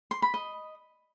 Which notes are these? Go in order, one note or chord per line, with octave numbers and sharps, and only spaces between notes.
C6
B5
D#5